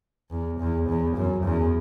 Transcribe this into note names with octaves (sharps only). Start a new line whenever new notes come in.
E2
E2
E2
F#2
E2